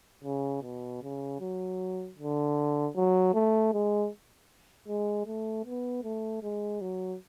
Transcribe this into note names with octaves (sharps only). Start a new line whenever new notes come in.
C#3
B2
C#3
F#3
D3
F#3
A3
G#3
G#3
A3
B3
A3
G#3
F#3